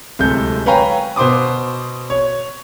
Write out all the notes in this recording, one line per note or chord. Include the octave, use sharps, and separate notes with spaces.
D1 C3 G#3 A4 G6
B4 C#5 F5 G5 G#5 A#5
B2 C5 C6 D6 D#6
C#5